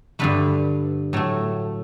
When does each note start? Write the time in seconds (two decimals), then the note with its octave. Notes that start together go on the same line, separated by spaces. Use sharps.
0.19 G2 D3 A3 B4
1.13 A2 F#3 A3